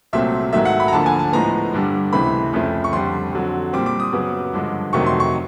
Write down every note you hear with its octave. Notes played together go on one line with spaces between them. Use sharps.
C2 A#2 F#3 A3 C4 E5
G#2 D#3 F#3 A3 E5
F#5
B5
A#5
D2 D3 F3 A#3 A5
G#5
A5
A2 F3 G#3 B3 A#5
G2 D3 G3
C#2 C3 E3 A3 C4 B5
F2 C#3 F3 A3 C4
C#6
F2 D3 G3 C6
F2 D3 F#3
A#2 G3 C4 D6
D6
D#6
F#2 C#3 F#3 B3
G2 D3 F3 G#3
F2 C3 D#3 F#3 A3 C#6
C6
C#6